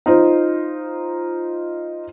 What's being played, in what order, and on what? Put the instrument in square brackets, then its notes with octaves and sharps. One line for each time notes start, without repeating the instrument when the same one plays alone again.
[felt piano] D#4 F4 C5